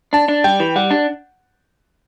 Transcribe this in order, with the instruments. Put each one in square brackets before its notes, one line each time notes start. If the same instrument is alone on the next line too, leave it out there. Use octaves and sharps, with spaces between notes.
[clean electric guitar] D4 [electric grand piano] A5
[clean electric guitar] D4
[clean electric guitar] G3 [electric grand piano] G5
[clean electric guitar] E3
[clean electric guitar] G3 [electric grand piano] F#5
[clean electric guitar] D4